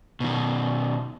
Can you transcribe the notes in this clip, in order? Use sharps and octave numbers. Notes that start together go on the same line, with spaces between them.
B2 D#3